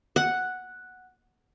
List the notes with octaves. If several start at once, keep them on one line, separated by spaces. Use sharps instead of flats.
F#5